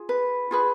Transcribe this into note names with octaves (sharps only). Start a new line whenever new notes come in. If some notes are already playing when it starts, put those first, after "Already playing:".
Already playing: F4 G#4
B4
F4 G#4 B4